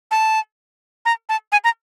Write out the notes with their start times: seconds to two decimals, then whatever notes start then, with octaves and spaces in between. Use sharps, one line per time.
0.11 A5
1.05 A#5
1.29 A5
1.52 G#5
1.64 A#5